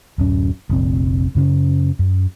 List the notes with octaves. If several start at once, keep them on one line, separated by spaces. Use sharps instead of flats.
D1 F#2 C#4
F1 A#1 C4
F#2 C#3 C4 C#4
F#2